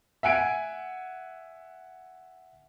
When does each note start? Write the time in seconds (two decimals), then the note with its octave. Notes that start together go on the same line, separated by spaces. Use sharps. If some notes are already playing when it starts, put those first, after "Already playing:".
0.23 E5 F#5 G#5 D7